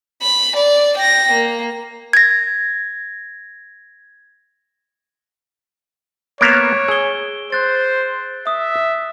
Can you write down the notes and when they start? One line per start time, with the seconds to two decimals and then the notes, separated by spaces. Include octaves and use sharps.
0.22 B5
0.56 D5
0.98 G5 A#6
1.32 A#3
2.13 G#6 A#6
6.41 A#3 B3 C#5 A#5 D7 E7
6.88 G#4 E6 G7
7.52 C5 F#6 A6
8.47 E5 D#6